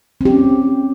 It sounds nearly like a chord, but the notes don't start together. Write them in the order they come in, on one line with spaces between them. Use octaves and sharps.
C4 G4 C#4